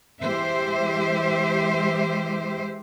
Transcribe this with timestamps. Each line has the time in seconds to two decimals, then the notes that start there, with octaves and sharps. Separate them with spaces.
0.21 E3 G#3 G4 C5 E5